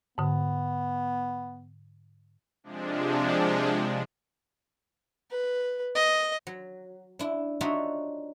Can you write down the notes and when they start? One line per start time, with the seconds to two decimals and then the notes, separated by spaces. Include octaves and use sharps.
0.18 G#2 D3 B3
2.64 C3 F3 G#3 D4
5.30 B4
5.95 D#5
6.47 F#3
7.19 D4 E4
7.61 D4 D#4 F4 F#4 C#5 E5